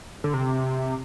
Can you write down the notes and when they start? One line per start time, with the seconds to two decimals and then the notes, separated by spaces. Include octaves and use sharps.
0.24 D3
0.34 C3